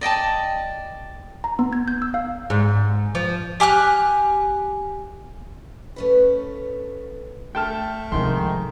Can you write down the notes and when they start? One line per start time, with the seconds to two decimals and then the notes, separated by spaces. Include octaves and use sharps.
0.01 D5 D#5 G5 A5
1.44 A#5
1.59 B3
1.73 G#6
1.88 G6
2.02 E6
2.14 F5
2.50 G#2
3.15 F3
3.60 G4 G#5 F6 F#6
5.96 A3 C#4 B4
7.55 A3 G5 A5 F6
8.12 G#2 C3 D#3 F3 G5 C6